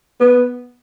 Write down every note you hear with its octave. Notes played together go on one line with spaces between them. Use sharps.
B3 B4